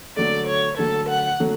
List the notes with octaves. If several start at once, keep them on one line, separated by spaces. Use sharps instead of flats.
D3 F#3 A3 D5
C#5
D3 F#3 A3 A4
F#5
D3 F#3 A3